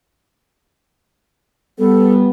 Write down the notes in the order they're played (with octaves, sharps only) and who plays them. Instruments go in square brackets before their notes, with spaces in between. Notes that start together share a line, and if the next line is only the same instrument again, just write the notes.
[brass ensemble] G3 B3 [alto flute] A4